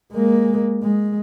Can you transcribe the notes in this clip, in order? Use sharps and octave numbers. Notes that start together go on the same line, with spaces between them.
G#3 A#3
G#3